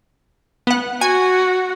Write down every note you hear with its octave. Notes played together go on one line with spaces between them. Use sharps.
B3 F#5
F#4 G#5